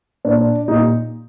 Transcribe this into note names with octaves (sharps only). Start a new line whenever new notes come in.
A#2 D4
A#2 D#4